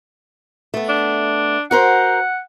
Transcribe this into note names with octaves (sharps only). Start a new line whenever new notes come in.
A3 B3
D4
F#4 A#4 C5 F#5